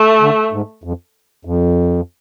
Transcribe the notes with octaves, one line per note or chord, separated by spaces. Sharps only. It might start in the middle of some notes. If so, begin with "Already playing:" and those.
Already playing: A3
D3
G#2
F2
F2